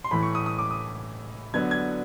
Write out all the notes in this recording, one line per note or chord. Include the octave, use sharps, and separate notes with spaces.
C6
A2 E3 A3 B5
C#6
D#6
D#6
D6
D#6
D3 F#3 B3 D4 G#6
G#6